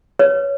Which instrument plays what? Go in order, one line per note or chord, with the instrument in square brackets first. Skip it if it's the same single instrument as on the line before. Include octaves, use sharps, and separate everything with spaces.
[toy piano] B4 C#5